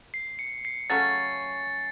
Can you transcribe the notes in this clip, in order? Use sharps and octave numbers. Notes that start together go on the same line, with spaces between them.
C7
C#7
C7
C#3 F#3 A3 C#4 A6